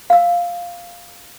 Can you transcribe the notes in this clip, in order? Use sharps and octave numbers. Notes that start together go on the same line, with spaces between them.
F5 E6